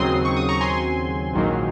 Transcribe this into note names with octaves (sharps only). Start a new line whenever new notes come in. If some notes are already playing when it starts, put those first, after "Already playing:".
Already playing: D#2 C#3 F#3 C4 C6 D#6
C#6
D#6
A#5 C#6
G#5 C6
A#1 G#2 D#3 F#3 A#3